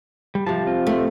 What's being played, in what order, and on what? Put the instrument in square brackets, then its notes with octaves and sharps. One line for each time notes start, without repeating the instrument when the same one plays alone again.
[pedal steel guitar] G3
[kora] C3 F3 [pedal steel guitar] A5
[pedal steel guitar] C4 F4
[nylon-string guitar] A3